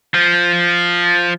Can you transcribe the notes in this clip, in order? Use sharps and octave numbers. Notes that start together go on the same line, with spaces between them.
F3